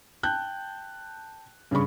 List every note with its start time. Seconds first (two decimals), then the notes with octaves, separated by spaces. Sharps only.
0.23 G5 A5 F#6 G6
1.71 G2 C#3 C#4 G#4 B5 C#6